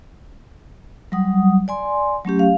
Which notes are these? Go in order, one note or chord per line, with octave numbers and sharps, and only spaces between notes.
F#3 G3 F#5 D#6
D5 G#5 C6
F#3 A3 C#4 G4
F5